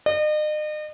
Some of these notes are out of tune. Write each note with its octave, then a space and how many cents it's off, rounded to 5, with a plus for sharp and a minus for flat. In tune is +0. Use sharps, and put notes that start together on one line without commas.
D#5 -40